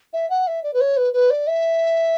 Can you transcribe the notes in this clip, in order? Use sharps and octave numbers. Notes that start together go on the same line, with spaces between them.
E5
F#5
E5
D5
B4
C#5
B4
B4
D5
E5